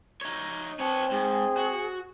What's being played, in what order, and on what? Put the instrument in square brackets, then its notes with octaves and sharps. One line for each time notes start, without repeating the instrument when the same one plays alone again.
[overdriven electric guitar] D#4 C#5
[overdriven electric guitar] B3 C#5 [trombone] C4 [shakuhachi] A5
[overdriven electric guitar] G#2 [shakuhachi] G#4
[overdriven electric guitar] F#4